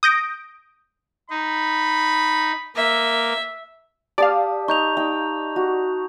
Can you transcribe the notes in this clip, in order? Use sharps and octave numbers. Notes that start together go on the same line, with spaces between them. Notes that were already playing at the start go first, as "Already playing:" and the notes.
D#6 G6 A#6 D7
D#4 B5
A#3 E5
G4 D5 F5 A5 D#6
D#4 C#6 G6 F7
D#4 G5
F#4